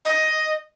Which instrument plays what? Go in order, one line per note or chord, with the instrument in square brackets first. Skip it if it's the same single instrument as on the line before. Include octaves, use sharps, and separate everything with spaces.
[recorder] D#5